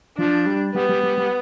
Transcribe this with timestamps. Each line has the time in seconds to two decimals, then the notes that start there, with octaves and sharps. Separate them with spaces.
0.18 F3 D4
0.46 G3
0.74 G3 B3
0.89 G3
1.03 G3
1.18 G3